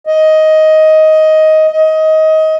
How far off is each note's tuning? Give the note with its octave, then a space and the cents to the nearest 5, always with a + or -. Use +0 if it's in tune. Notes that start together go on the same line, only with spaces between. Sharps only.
D#5 +10
D#5 +20